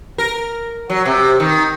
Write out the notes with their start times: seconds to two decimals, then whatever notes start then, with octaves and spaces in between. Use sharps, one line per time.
0.18 A#4
0.90 F#3
1.05 C3
1.40 D#3